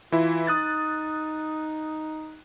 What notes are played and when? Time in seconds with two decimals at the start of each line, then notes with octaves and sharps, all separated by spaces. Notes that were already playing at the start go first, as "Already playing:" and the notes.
0.12 E3 E4 F4
0.47 D#4 D#6 F#6 A6